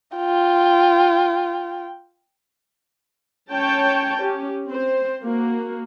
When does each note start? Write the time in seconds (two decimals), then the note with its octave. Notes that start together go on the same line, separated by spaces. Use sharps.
0.16 F4 G5
3.51 C#4 C#5 G5 A5
4.19 C#4 G4
4.66 C4 C5
5.22 A#3 F#4